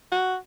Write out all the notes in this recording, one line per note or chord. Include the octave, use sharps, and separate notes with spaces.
F#4